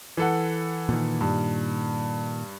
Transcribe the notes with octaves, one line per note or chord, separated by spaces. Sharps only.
E3 A4 F#5
A#2 D#3
G2